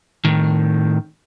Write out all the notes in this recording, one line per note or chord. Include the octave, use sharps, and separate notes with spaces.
A2 D#3